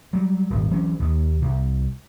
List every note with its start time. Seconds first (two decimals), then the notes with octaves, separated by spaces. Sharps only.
0.13 F#3 G3
0.50 D#1 G#1
0.71 E3 F#3 C#4
0.99 D#2 D#3
1.42 C2